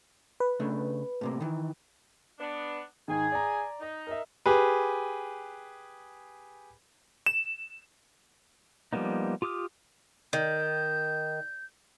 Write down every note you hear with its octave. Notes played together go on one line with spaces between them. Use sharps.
B4
C#3 A3 D4
A2 C3 A#3
D#3 E3
B3 D4
G#2 D#3 G#4 G#5
D5 A#5
D#4
A#4 D#5 E5
G4 G#4 B4
E7
F3 G3 A#3 B3 D#4
F4 G4 D6 D#6 F6
D#3 G6